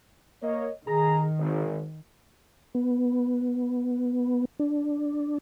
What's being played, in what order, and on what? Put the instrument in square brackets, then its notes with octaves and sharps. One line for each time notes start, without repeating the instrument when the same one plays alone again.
[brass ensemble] A#3 C#5 D#5
[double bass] D#3 [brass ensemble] G#4 A#5
[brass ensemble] G#1
[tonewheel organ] B3
D4